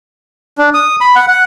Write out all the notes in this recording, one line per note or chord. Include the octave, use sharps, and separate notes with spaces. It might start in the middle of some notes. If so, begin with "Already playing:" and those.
D4
D#6
B5
F#5
F#5